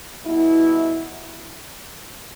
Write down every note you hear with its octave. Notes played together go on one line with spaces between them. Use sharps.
B2 G3 B3 E4